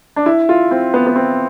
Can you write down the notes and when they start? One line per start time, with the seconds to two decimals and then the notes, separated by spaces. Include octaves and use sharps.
0.16 D4
0.26 E4
0.49 F4
0.71 C4
0.94 B3
1.07 B3
1.16 C4